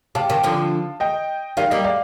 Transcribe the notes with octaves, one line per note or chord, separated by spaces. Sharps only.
C3 F5 A5
C3 D#3
D3 F3
D#5 G5
D#3 G3 F5
G3 A#3 D#5
D5 F5